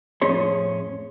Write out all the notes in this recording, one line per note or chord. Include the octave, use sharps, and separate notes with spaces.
F2 A2 C#4 G#4 C#5 C6